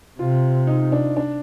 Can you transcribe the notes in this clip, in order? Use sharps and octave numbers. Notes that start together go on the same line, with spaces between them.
C3 F4
D#4
D4
D4